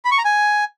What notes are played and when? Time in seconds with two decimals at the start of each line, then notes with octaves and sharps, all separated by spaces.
0.05 B5
0.11 C#6
0.18 A#5
0.25 G#5